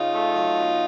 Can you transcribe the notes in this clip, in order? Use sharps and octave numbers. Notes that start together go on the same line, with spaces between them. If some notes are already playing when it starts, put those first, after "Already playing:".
Already playing: C#3 D#4 F4
A3
F#3
B2